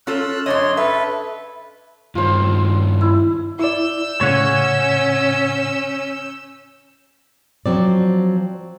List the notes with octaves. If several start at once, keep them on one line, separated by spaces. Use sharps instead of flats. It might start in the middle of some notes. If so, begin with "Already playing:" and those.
C#4 F4 A4 E6 F#6
F#2 D4 C#5 D#5 C6
A4 B4 E5
G2 D#3 F4 C5
E4
E4 D5 E6 G6
A2 C#3 C#4 C#5 F#5 G#5
F3 F#3 C4 D5